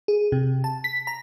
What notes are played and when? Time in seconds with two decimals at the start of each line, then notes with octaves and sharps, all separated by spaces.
0.08 G#4
0.32 C3
0.64 A5
0.84 B6
1.07 A#5